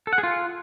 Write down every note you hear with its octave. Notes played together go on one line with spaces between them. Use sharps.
A4
F#5
G#4
F4